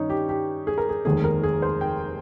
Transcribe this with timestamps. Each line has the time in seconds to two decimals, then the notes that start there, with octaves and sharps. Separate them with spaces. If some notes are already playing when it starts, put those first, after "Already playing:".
Already playing: G2 D#3 C#4 D#4
0.10 G4
0.29 G4
0.67 G#4
0.78 A#4
0.89 G#4
1.05 F1 D#2 D#3 G#3 G#4
1.24 A#4
1.43 G#4
1.62 C5
1.81 G5